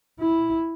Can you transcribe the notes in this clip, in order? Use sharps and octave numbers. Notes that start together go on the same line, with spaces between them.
E4